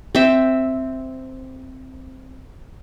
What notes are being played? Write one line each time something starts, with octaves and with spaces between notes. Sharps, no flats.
C4 E5